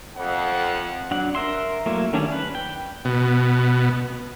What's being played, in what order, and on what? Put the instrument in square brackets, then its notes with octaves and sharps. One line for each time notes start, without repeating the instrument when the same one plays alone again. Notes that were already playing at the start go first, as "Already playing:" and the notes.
[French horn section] F2 [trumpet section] F#5
[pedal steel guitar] F#3 D4 F#5
A#4 E5 C6
F#3 A3 A#3 E4
D3 D#3 G3 C#4 D4
B4
G5
[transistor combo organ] B2